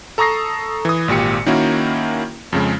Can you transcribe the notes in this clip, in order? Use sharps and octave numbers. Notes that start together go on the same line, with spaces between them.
A4 A#5 C#6 D#6 A#6 C7
E3 D#6
G#1 A#2 G4 C#7
D#3 A#3 C#4 E4 F#4
F2 C#3 G#3